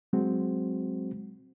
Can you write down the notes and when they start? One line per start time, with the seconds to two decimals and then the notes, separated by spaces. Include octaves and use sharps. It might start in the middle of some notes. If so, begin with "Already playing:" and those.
0.13 F#3 G#3 C4 F#4 C5